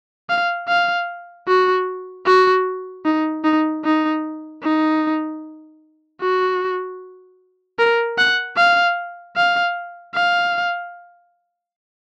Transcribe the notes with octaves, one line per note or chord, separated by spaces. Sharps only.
F5
F5
F#4
F#4
D#4
D#4
D#4
D#4
F#4
A#4
F#5
F5
F5
F5